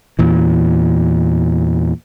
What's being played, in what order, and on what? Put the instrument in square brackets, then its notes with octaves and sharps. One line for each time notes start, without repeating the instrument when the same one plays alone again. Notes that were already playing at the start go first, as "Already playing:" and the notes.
[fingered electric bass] E2 A#2 E3